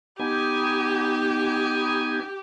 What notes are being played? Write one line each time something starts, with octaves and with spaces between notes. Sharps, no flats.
B3 D#4 G4 G#5